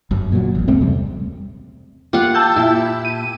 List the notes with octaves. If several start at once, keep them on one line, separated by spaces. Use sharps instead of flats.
G1 F#2
A#2 F#3
D1 A1
C#2 G2 A3 C4
E2 C3 G3
A#3 F4 G4 F#5
A5 E6 G6
A#2 E4
D#7